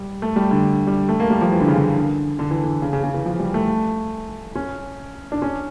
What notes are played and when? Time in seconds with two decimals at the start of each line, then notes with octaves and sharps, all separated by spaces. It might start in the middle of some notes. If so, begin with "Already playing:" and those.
Already playing: G3
0.22 A3
0.36 G3
0.51 D3
0.87 G3
1.09 A3
1.20 A#3
1.30 G3
1.41 F3
1.52 E3
1.60 D3
1.68 C#3
1.76 D3
2.39 D3
2.51 E3
2.63 D3
2.82 C#3
2.93 C#3
3.04 C#3
3.14 E3
3.26 F3
3.39 G3
3.54 A3
4.55 C#4
5.32 D4
5.42 C#4